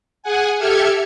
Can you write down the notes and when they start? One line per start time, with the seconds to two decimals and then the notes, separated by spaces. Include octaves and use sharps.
0.23 G#4 F#5 G#5
0.58 G4 A4 E5 F6 G#6 C#7